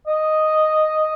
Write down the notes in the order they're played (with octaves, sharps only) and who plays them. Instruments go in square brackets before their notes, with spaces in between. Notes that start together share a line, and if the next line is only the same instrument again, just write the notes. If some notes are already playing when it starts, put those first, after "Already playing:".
[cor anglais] D#5